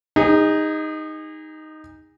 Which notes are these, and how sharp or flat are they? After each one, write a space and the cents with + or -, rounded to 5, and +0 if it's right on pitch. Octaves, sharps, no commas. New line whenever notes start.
D#4 +0 G#4 -35